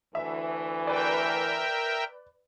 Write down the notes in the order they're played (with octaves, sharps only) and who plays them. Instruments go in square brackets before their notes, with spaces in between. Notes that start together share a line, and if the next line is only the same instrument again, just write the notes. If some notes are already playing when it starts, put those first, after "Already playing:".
[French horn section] D2 E3 [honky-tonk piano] E5
[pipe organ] A#4 E5 G5 [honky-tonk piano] B4 D5